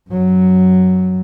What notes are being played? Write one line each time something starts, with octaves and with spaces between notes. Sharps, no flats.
F#2 F#3